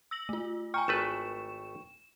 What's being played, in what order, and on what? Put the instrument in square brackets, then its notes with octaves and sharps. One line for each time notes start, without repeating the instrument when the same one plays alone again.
[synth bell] E6 A#6 F#7
A3 F4
[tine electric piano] G5 C#6 [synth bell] G#5 A#5 F6
[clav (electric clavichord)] G#1 A3 B4 [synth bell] E7